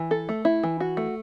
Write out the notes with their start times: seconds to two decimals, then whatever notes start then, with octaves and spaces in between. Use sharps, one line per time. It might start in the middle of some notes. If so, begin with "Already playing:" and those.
Already playing: E3
0.11 A4
0.29 A3
0.45 E4
0.63 E3
0.80 F#4
0.97 A3